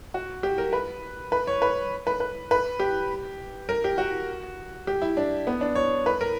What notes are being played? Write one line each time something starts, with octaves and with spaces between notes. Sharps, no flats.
F#4
G4
A#4
B4
B4
C#5
B4
B4
B4
B4
G4
A#4
G4
F#4
G4
E4
D4
B3
D4
C#5
B4
A#4